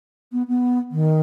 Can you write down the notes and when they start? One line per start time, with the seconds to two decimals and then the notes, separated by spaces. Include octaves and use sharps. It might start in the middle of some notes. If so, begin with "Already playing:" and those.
0.32 B3
0.48 B3
0.91 D#3